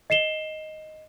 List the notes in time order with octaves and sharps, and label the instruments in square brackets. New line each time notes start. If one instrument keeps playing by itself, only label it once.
[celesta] D#5 C7 E7 G7